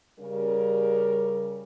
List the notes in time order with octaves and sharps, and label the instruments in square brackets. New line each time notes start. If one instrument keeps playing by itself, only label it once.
[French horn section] C#3 G3 A#4